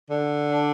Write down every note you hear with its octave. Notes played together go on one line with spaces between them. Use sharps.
D3
D4